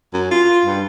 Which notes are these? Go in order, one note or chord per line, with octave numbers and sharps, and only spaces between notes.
F#2
F4
G2